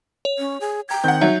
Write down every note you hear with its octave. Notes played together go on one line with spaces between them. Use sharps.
C#5
C#4
G#4
G5 A#5 G#6
D#3 C4 F#5 G6
F#3 D#4 E5